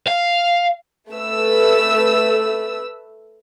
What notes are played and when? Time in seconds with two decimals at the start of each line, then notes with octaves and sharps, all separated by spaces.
0.07 F5
1.11 A3 B4 E6